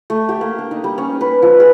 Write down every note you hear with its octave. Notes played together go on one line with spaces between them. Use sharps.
A3
G4
A#3
D4
D#4
G3
C#4
B4
F3
G#4